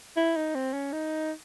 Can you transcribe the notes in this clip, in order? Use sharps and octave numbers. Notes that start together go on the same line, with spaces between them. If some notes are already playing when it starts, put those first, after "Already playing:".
E4
D#4
C4
C#4
D#4